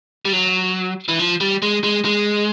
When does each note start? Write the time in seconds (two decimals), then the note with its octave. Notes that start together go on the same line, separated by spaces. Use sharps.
0.25 G3
0.33 F#3
1.09 E3
1.19 F3
1.41 G3
1.62 G#3
1.84 G#3
2.05 G#3